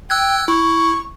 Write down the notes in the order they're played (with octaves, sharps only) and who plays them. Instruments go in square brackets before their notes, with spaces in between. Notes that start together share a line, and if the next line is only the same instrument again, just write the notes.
[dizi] G5 [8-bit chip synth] E6 F#6 G#6
[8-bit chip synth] E4 [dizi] C#6